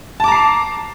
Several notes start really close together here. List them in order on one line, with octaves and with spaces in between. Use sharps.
A5 D6 A#5 C7